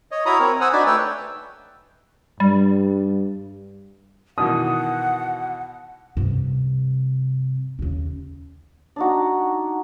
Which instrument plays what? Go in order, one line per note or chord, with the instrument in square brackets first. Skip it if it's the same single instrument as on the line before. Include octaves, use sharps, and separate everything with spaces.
[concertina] C#5 D#5
E4 F#4 C#5 A#5 B5 D#6
C4 A#4 C#5
C5 F#5 G#5 D#6 E6
D4 D#4 F#4 D5 G#5 B5
A3 B4 C#5 G5 E6
[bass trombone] G2 [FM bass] G3
[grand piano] B2 D#3 E3 [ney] F#5 [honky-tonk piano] D#6
[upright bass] G2 C3
D#2 C#3
[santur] D4 D#4 F#4